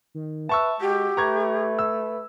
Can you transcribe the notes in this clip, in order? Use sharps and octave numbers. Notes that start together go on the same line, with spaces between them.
D#3
B4 E5 A5 C#6 E6
G#3 F#4 G4
A3 B4 A#5 C#6 G#6
E6